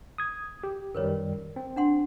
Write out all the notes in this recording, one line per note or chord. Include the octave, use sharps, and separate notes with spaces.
D#6 G#6
G4
F#2 D#3 G3 A#4 B4 C#5
C4
D4 F#5 C6